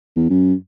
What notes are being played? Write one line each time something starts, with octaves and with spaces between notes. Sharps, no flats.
E2
F#2